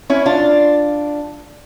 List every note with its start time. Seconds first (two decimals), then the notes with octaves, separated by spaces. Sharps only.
0.10 C#4 E4
0.26 D4 F4